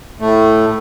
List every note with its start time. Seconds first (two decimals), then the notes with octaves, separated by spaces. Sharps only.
0.20 A2 A3